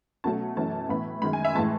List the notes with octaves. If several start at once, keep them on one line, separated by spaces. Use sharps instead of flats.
B2 F#3 A3 C#4 A5
F#2 E3 A3 C#4 A5
A2 E3 B3 B5
F#2 D#3 G#3 B5
G#5
E5
A2 E3 G#3 A5